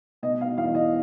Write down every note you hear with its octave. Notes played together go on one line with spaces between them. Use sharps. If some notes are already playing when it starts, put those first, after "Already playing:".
B2 D#5
F5
E2 F5
D#5